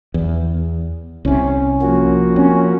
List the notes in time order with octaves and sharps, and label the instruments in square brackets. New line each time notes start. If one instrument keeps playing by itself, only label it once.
[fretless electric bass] E2
[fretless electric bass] C2 C3 [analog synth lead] C#4
[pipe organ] F3 A#3 F#4
[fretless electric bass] C4 [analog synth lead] C#4